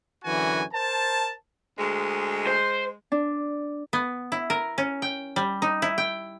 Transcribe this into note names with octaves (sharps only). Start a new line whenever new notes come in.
F#2 D3 E3 F#4 G#5
A#4 C5 A5
D2 G#3
C5
D4
B3
E4
A#4
C#4
G5
G3
D#4
E4
G5